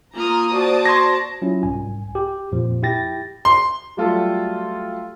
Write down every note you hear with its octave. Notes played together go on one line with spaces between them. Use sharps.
A#3 F4 A#5 D#6 F6
F#4 C5 D5 A5
C6 G#6 A#6
F#3 C#4 E4 F4
C2 G#2 G#5
G4
F2 A#2 F3
E4 G4 G5 A6 A#6
C6
F#3 G3 A3 F4 G4 A4